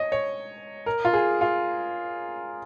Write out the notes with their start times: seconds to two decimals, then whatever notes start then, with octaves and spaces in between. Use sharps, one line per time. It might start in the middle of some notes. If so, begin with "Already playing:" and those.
Already playing: C#5 D#5
0.12 C#5
0.86 A#4
1.05 F4
1.13 G#4
1.41 F4